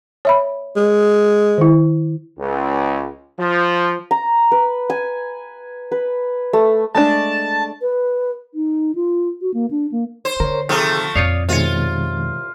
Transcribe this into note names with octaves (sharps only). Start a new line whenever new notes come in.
C#5 E5 B5
G#3
D#3 E4
C#2
F3
A#5
B4
G#5
B4
A3
G#3 A3 D4 A5
B4
D#4
F4
F#4
A#3
D4
A#3
C5
D3 A#4 C#5
C3 D#3 F3 A3 G#4
F2 A#2 F4 C#5 D5 F5 D#6
C2 B2 D#3 G#3 F4 C#5